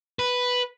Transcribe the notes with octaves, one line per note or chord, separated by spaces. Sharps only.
B4